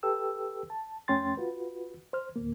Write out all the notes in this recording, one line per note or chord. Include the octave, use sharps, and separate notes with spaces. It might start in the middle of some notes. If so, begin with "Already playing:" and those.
G4 A4 B4 G5 E6
A5
F2 A3 C#4 G5 C6 A6
F4 F#4 B4
C5 F6
D2 A2 A#3